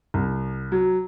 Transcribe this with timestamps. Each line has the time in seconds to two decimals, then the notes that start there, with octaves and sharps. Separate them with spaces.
0.14 C2
0.72 F#3